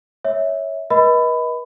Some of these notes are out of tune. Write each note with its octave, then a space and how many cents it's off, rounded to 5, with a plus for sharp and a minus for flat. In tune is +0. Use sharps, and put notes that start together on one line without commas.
C#5 +0 E5 -20
B4 -40 D#5 +25 B5 +15